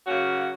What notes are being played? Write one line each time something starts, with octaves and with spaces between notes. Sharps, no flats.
C#3 F#3 A#3 C#4 F#4